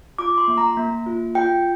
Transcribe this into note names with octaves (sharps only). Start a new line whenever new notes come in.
F4 D6
C6
A#3
A#5
A#3
F4
F4 G5